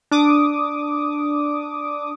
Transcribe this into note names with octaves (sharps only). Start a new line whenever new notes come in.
D4 D6 D#6